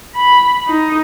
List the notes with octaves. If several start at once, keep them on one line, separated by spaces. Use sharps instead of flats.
B5
D#4